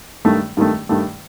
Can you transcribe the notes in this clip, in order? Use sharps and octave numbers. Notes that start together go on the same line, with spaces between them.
G2 D#3 A3
G2 D#3 A3
G2 D#3 A3